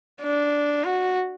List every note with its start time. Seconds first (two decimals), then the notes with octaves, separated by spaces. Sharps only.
0.21 D4
0.84 F#4